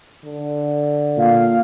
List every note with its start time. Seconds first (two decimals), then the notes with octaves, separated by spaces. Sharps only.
0.25 D3
1.18 A#2 F5